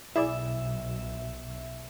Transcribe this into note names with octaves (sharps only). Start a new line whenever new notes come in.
B1 E4 G#4 D5 E5